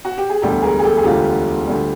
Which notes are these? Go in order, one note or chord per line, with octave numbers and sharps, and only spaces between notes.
F#4
G4
G#4
E1 D2 D3 G3 G4 A4
G#4 A#4
G#4
G4 A4
G#4
E1 D2 D3 G3 F4 G4
D2 D3 G3